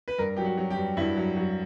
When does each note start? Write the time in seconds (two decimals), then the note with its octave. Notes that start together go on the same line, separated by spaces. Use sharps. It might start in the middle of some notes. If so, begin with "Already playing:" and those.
0.08 B4
0.18 G2 A#4
0.37 F#3 G4
0.45 F#4
0.58 F#3
0.70 G4
0.77 G2
0.97 G2 E4
1.17 F#3
1.36 F#3